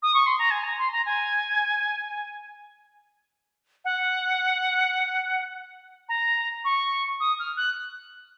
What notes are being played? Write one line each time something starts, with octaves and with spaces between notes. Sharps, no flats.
D#6
C#6
C6
A#5
G#5
A#5
C6
A#5
G#5
F#5
A#5
C#6
D#6
F6
F#6